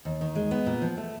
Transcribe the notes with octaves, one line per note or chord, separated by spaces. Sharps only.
D#2
D#3
G#3
B3
A#2
F3
A3